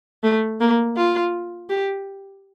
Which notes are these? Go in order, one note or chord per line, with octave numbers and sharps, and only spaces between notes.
A3
A#3
F4
G4